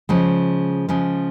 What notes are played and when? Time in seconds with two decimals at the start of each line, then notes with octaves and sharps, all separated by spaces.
0.09 C#3 F3 G#3
0.89 C#3 F3 G#3